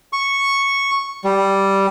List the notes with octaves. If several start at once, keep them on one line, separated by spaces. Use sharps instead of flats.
C#6
G3